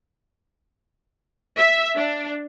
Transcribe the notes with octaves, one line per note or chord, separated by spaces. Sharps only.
E5
D4